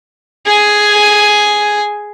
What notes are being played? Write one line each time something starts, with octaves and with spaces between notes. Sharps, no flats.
G#4 G#5